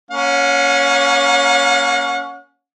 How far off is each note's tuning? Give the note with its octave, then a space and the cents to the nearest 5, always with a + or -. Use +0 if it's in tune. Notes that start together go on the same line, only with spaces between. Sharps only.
A#3 +10 C#4 +10 F#5 -40